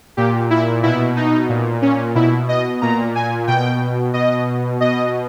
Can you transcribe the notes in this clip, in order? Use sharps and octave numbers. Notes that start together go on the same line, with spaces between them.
A#2 G4
E4
B2 E4
D#4
A#2
C#4
B2 E4
D#5
A#2 A#5
G#5
B2 G5
B2 D#5
B2 D#5